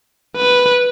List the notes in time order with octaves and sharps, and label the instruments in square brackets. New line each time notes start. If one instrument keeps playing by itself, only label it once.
[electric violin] B4